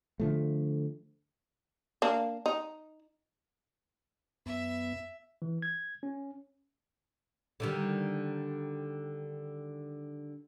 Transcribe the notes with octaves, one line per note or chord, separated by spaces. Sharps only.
D3 F3 A3
A#3 D4
D#4
F#2 B3 E5
E3
G#6
C#4
D3 D#3 G3